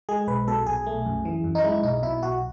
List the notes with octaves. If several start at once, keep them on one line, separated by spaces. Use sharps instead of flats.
G#3 G#4
B1 B4
B2 A4
B1 G#4
A3
F#2
E3
F#2
D#4
G#3 E4
B1 D#4
B2 E4
B1 F#4